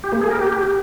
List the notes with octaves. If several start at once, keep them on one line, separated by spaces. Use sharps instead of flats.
G4
A#3
G#4
A#4
G4